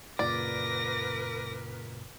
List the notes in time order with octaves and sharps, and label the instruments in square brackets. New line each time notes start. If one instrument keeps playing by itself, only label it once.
[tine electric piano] F#2 A#2 C#3 [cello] A#4 B4 [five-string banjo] D5 [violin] D6 A#6